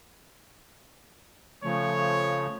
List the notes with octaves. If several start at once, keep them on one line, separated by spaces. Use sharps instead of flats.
C#3 F3 A3 C#5